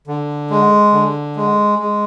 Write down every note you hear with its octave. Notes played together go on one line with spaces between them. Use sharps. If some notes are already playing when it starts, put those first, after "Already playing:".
D3
G#3
D3
G#3
G#3